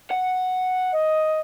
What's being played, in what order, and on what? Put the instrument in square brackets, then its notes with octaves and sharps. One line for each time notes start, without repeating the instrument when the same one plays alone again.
[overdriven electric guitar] F#5
[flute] D#5